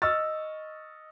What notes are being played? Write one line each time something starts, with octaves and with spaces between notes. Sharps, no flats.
D#5 C#6 E6 F6 A6